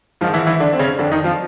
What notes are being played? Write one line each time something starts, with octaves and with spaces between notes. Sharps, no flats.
G#2 D#3 F3 F4
E3 E4
E3 E4
D3 D4
C4
C#3 C#4
F2 D3 D4
D#3 D#4
F3 F4